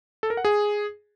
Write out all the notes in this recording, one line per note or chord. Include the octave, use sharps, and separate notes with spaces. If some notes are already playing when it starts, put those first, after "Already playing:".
A4
A#4
F#5
G#4